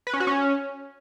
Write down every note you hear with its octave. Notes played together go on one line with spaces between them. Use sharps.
B4
C#4
F#4
C#4